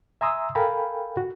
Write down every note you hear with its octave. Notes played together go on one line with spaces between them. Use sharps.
E5 G#5 A#5 C6 D#6 E6
A4 A#4 F5 G5 G#5 B5
F#4